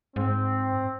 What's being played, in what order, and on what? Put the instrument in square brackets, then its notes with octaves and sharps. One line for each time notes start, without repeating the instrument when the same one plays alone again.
[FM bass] G#2 [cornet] C4